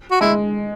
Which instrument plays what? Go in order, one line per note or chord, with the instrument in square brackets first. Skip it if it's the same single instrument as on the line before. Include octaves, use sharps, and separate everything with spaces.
[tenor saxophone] F#4
[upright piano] G#3 [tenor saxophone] E4